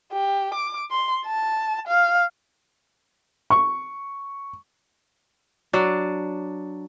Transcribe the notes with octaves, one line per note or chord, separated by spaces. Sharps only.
G4
D6
C6
A5
F5
C#6
F#3 D4